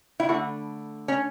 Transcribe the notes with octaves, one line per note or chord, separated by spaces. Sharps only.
E4
D3 A3 F#4
C#4